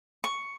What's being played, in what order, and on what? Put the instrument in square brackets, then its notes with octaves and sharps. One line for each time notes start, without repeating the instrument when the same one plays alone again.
[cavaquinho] C#6